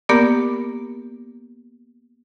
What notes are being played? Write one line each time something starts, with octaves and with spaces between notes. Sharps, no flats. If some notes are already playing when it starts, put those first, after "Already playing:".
A#3 B3 G4 A#4 D5 D6